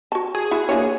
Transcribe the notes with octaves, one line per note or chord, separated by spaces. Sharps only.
F#4 A5
G#4
E4 F#4
A#3 D4 C#5